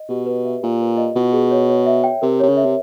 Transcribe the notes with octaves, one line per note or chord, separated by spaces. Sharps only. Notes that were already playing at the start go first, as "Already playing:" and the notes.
Already playing: D#5
B2 G4
B4
E5
A#2 G4
B4
D#5
B2 F4
G#4
C#5
C#5
E5
G5
C3 A#4
C3 C#5
C#3
E5
C3